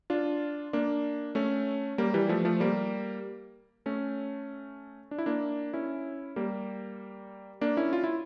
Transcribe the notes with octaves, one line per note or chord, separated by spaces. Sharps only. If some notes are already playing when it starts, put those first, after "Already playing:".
D4 F4
A#3 D4
A3 C#4
G3 A#3
E3 G3
F3 A3
F3 A3
G3 A#3
A3 C#4
D4
E4
A#3 D4
C#4 E4
G3 A#3
A#3 D4
C#4 E4
F4
E4